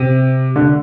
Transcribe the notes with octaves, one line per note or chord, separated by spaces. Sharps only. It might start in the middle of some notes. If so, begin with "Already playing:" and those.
Already playing: C3
D3